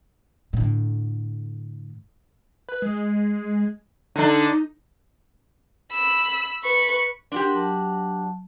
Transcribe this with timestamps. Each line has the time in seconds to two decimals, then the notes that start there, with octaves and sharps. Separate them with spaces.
0.53 A2 D3
2.69 B4
2.82 G#3
4.16 D3 D4 D#4
5.92 B5 E6
6.63 B4 C#6
7.32 D4 F#4 G4 A#4 C6
7.54 F#3 F#5 A5